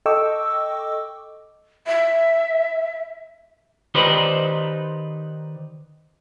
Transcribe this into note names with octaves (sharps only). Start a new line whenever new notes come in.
A4 D#5 G5 C#6 D6 E6
E5
D#3 D#4 G4 B4 C5 D5